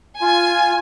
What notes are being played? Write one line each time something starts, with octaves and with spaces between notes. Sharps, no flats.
F4 G#5